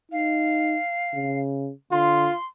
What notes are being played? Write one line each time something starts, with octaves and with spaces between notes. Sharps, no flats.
D#4 F5
C#3
D3 F4 C6